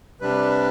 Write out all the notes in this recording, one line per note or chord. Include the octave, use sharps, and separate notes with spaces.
C3 G3 D4 B4